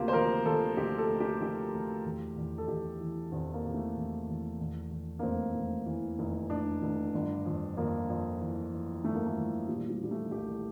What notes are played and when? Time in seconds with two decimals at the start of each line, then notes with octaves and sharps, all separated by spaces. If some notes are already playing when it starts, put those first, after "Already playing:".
Already playing: D2 C3 A#3 F4 G4
0.08 C5
0.13 F3 A#4
0.45 F3 A4
0.77 D2 G4
0.98 A4
1.09 D2
1.20 G4
1.41 F3 G4
1.73 D2
2.05 E2
2.36 E2
2.58 A4
2.68 E2 G4
3.00 E3
3.31 E2 C4
3.54 A#3
3.64 C3
3.74 A3
3.95 E2
4.27 E2
4.60 E2
4.91 E2
5.19 A#3
5.23 F1 C4
5.54 F1
5.86 E3
6.19 F1
6.50 F1 D4
6.82 F1
7.14 G1
7.45 F2
7.77 F2 A#3
8.09 F2
8.41 E3
8.72 E3
9.04 G1 A3
9.15 A#3
9.26 A3
9.37 E3
9.68 A#2 G3
9.89 G3
10.00 A#2 G3
10.11 A3
10.31 C2 G4